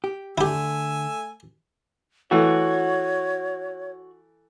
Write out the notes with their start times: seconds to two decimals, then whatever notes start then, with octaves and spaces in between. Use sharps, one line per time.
0.04 G4
0.38 D3 A3 E4 G4 G#5 E6
2.31 E3 A3 F#4 C#5